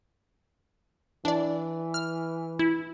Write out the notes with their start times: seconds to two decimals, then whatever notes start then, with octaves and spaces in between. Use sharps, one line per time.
1.25 E3 D4 D5
1.94 F6
2.59 E4